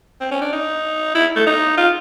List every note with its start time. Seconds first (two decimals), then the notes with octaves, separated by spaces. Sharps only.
0.21 C4
0.31 C#4
0.41 D4
0.52 D#4
1.15 E4
1.36 A3
1.46 D#4
1.77 F4